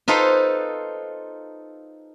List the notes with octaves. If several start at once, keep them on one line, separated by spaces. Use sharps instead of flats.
D#4 F4 A4 B4 C5